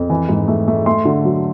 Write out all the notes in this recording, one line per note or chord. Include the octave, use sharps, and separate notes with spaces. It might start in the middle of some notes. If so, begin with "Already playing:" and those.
Already playing: F2
E3
G#2
A3
A3
A3 C6
D3
F#3